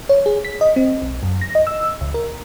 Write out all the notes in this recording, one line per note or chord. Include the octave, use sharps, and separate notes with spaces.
C#5
G#4
B6
D#5
C4
B1
F#2
A#6
D#5
E6
C#2
A#4